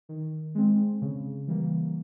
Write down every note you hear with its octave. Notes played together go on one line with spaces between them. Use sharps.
D#3
G#3 C4
C#3
E3 G3 A#3